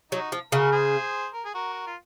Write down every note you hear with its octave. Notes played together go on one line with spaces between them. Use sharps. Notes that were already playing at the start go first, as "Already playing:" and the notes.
F#3 D#4 F#4
F3
C#3 F#4 A#4
G#4 C5
A#4
G#4
F#4 A#4
F4